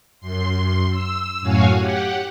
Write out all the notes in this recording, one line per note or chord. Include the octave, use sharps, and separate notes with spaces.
F#2 C6
E6
F#2 A2 F#4 C#5 F5 G#5
G4 F#5